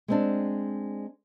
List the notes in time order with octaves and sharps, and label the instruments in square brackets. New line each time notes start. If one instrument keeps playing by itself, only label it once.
[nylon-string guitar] G#3 C4 D4